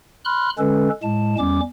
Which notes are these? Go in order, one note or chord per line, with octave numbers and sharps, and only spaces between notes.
B5 C6 F6 F#6
D3 G#3 C#4 A4 B4
A2 G#3 A5
E2 G3 C#4 D6